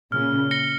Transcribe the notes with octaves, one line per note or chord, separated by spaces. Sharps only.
A#2 C#3 F6
A#6 C#7 G7